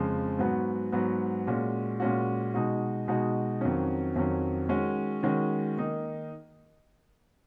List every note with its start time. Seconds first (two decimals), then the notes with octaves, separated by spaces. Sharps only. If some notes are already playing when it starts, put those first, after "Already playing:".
Already playing: F2 C#3 F3 G#3
0.39 G#2 F#3 B3 F#4
0.92 G#2 F#3 B3 F#4
1.47 A#2 G#3 C#4 F#4
2.00 A#2 G#3 C#4 F#4
2.54 B2 G#3 D#4 F#4
3.08 B2 G#3 D#4 F#4
3.61 F2 D#3 F#3 C#4
4.16 F2 D#3 F#3 C#4
4.69 D#3 G#3 C#4 F#4
5.23 D#3 G#3 C#4 F#4
5.77 D#3 A#3 D#4